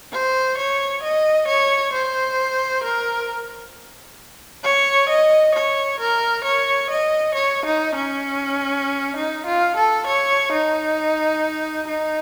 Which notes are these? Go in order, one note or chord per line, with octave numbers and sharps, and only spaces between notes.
C5
C#5
D#5
C#5
C5
A#4
C#5
D#5
C#5
A#4
C#5
D#5
C#5
D#4
C#4
D#4
F4
A4
C#5
D#4
D#4